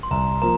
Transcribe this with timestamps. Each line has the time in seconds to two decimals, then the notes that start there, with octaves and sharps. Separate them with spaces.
0.03 C6
0.11 C2 A#5
0.42 F3 A#3 A#5